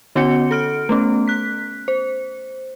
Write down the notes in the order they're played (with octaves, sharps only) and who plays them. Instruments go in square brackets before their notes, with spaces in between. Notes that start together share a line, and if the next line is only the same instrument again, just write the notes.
[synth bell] D3 B3 C#4 F#4 F#5 C#7
A4 F6 D7
A3 B3 C#4
F#6 B6
C5